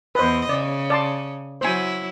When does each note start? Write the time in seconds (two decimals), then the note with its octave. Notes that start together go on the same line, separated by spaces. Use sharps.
0.15 E2 B4 C5 D#5
0.49 C#3 D5
0.90 D5 A5 C6
1.61 F#3 E4 C5 G#5